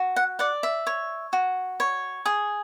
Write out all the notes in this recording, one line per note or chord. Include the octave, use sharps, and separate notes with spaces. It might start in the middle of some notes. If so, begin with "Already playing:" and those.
Already playing: F#4
F#5
D5 F#5
E5
C#5
F#4
C#5
G#4